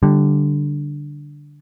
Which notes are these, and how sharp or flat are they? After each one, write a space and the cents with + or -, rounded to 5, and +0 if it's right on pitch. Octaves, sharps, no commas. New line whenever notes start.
D3 +0 G3 +0